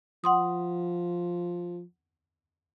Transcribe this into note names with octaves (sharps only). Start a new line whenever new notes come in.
F3 F#5 C6 D#6